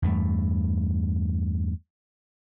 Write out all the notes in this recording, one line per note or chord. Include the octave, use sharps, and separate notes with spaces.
E2 G2 A3